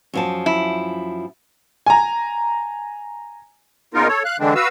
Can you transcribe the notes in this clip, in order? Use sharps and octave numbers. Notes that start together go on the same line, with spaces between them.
F#2 F3 A5
E4
G#5 A#5
A#2 C#3 B3 D#4 F4 A#4
A4 C#5
F5 F#6
D3 E3 G#3 C4 D4
F#4 B4 F5 E6